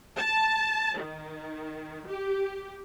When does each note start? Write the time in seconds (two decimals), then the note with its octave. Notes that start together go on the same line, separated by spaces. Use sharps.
0.16 A5
0.97 D#3
2.07 G4